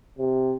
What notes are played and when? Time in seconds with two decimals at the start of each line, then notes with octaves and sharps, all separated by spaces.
0.19 C3